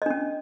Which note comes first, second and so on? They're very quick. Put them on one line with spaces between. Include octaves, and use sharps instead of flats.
D#5 D4 C#4